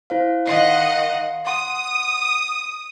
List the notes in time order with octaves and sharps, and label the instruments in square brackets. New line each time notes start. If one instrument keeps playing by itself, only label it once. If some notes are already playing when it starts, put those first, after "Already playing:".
[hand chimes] E4 C5 F5
[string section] D#3 D#5 F#5 [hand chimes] F5 C6 C7
[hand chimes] F#5 C6 [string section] D#6